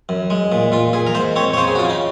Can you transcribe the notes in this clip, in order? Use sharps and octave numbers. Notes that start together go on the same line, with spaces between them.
F#2
G#3
A#2
A#2 F4
A#2 G#4
A#4
G#2 C5
C4 C#5
C#5
C#3 C5
G#4
F#4
C#3 F4
C#4
D#4